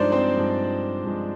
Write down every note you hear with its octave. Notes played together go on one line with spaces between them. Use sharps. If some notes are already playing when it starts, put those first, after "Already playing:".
Already playing: G2 F3 G#3 D4 D#4 C5 D5
C4 C5
G2 F3 G#3
G2 F3 G#3